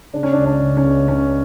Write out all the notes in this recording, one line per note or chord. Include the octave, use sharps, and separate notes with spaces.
C#3 D4
C#4
D4
C#2
D4
C#3
C#4
C#2
C#3 C#4